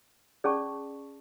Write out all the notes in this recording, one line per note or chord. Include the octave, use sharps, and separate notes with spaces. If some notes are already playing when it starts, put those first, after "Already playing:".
C#4 G#4 D5 A5 C#6